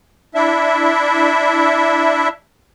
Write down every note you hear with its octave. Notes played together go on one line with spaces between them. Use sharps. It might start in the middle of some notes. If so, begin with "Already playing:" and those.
D4 E4 E5